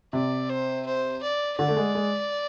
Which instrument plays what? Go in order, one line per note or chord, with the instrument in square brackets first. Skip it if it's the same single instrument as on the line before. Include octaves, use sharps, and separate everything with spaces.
[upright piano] C3 [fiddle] D5
[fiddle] C5
C5
D5
[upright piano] D3 [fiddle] D5
[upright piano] A3
G#3
G#3